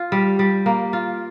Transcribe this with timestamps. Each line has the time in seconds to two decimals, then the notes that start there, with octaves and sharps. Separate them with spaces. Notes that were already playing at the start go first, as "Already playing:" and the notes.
Already playing: F4
0.12 G3
0.39 G3
0.66 A#3
0.93 F4